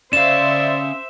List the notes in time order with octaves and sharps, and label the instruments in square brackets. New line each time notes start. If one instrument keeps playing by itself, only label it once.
[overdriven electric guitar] C#4 F5 [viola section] C5 E5 [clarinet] D5 [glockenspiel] E7